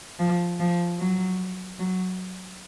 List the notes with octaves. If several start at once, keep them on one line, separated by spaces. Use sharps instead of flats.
F3
F3
F#3
F#3